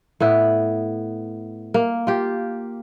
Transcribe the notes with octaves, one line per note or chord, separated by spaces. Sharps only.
A2 B3 E4
A#3
F4 G4